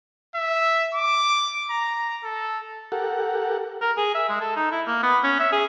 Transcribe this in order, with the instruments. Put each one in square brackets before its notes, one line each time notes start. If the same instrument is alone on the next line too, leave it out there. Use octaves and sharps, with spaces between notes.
[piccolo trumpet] E5
D6
A#5
A4
[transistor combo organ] G4 A4 A#4 F#5
[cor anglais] A#4
G#4
E5
G#3
A4
D#4
E4
A#3
B3
C#4
E5
G#4